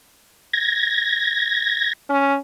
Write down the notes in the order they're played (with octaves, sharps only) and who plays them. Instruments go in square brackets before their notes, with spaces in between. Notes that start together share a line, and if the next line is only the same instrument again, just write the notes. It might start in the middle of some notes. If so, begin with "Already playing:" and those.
[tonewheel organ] G#6 A#6
[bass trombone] C#4